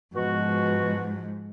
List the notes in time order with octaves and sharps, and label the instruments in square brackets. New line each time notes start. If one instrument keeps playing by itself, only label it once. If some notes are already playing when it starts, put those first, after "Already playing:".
[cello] G#2 F3 [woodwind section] B2 F#4